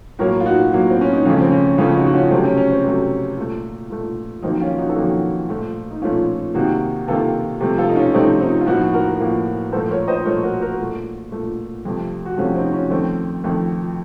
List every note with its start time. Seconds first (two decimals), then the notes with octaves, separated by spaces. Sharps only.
0.19 A2 F#3 A#3 A#4 C#5
0.40 F4
0.45 D#4 F#4
0.72 A2 F#3 A#3
0.90 C4
1.01 C#4
1.13 D#4
1.25 F2 C#3 F3 A3 C#4 F4
1.40 C4
1.51 C#4
1.78 F2 C#3 F3 A3 C#4 F4
1.96 D#4 F#4
2.06 F#4
2.13 C#4 F4
2.31 C3 F#3 A3 C4
2.44 C#4
2.57 C#4
2.71 C4
2.84 C3 F#3 A3
3.37 A#2 A3
3.90 A#2 A3
4.42 F2 D#3 F#3 A#3 C4 D#4
4.61 C#4 F4
4.78 D#4 F#4
4.89 A4
4.95 F2 D#3 F#3 A#3 D#4 F#4
5.49 A#2 F3 A3
5.91 D#4
6.02 A#2 F3 A3 C#4 F4
6.54 C3 D#3 A#3 D#4 F#4
7.08 C3 D#3 A#3 F4 A4
7.61 C3 F3 A3
7.78 F4 A4
7.89 D#4
7.96 C#4 F4
8.14 C3 F3 A3 C4 D#4
8.41 C4 D#4
8.61 F4
8.67 A2 F3 A#3 D#4 F#4
8.94 F#4 A#4
9.20 A2 F3 A#3
9.72 A#2 F3 A3 A4 C5
9.91 A#4 C#5
10.08 C5 D#5
10.25 A#2 F3 A3 A#4 C#5
10.43 F#4 A#4
10.61 F#4 A#4
10.79 A#2 A3
11.32 A#2 A3
11.85 F2 C3 F3 A3
12.25 F#4
12.37 F2 C3 F3 A3 C#4 F4
12.55 C4 D#4
12.73 C#4
12.90 F2 D#3 A3 C4
13.44 F2 D#3 A3